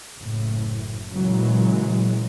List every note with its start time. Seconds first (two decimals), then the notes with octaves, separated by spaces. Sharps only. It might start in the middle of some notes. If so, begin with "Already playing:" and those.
0.19 F#1 A2
1.11 A#2 C#3 E3 F#3 G#3